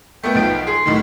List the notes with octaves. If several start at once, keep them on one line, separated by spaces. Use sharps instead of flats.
A3 B3 G5
B1 F3 D7
G#4 C6
B1 A2 D#3